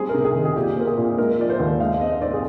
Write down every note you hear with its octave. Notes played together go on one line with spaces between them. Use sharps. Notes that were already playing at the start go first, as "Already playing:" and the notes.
Already playing: G3 C4 G#4
C3 A#4
G#4
D#3
G#4
A#2 G4
C4 A#4
G#4
A#2
G#3 A#4
F3 D5
C5
D#2
G#3 F5
C4 D#5
C4 D5
G#4